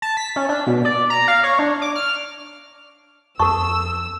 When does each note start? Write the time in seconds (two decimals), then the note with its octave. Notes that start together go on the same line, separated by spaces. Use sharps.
0.02 A5
0.17 B6
0.36 C#4
0.49 D4
0.67 B2
0.85 D5
1.10 A#5
1.28 F5
1.43 C#5
1.59 D4
1.82 D6
1.95 F6
3.39 F2 B3 A4 A5 C#6 E6